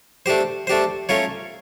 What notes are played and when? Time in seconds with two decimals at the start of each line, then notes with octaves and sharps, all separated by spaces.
0.26 A3 D4 G4 C5
0.67 A3 D4 G4 C5
1.09 A3 C#4 F4 A#4 C#5